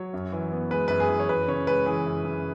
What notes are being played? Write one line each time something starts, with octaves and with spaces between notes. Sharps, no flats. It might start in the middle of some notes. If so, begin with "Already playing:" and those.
Already playing: F#3 C#5
F#2
E3
B3
G#3 B4
F#2 B4
G#4
E3
C#5
F#2 B4
C#3 C#5
G#3 B4
E3 G#4
F#2
C#3